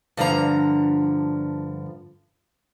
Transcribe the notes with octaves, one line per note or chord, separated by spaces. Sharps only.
G2 D3 F3 A4 A#5